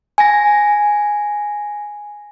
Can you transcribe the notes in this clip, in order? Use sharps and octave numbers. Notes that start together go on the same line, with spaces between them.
G#5 A#6